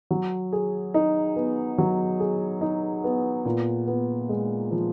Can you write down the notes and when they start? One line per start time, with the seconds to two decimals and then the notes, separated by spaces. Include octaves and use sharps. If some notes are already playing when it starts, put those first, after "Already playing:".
0.11 F#3
0.53 G#4
0.94 D#4
1.36 B3
1.78 F#3
2.20 G#4
2.61 D#4
3.04 B3
3.45 A#2
3.88 B3
4.29 G#3
4.71 F3